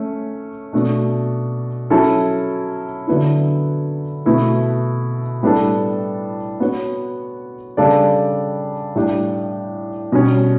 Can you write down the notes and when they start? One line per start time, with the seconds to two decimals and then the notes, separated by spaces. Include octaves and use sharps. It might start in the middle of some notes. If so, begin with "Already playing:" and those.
Already playing: A3 C#4
0.73 B2 A3 D4
1.90 F#3 C#4 E4 A4
3.07 D3 F#3 B3 E4
4.25 B2 A3 E4 B4
5.43 A2 G3 B3 D4 A4
6.60 B3 F#4 C#5
7.77 C#3 G3 D4 A4 D5
8.95 A2 G3 D4 G4
10.12 B2 G3 C#4